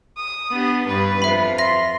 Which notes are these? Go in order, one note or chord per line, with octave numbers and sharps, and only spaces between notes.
D#6
B3 D4 G4
G2 D4 B4
F2 F3 F4 E5 B5
E5 C6 A#6